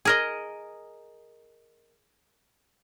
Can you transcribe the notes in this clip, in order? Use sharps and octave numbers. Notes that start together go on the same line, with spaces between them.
G#4 A#4 D#5